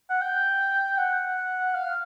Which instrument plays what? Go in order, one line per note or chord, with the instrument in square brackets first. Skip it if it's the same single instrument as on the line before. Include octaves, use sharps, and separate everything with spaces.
[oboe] F#5
G5
F#5
F5